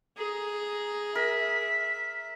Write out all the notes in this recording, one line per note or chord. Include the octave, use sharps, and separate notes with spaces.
G#4 A#5
A#4 E5 B6